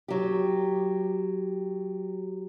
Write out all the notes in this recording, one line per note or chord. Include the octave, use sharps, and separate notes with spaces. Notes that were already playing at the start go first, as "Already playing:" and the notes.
F#3 G4